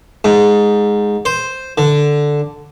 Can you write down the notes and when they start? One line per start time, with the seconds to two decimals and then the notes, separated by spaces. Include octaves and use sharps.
0.25 G#2
1.25 C5
1.78 D3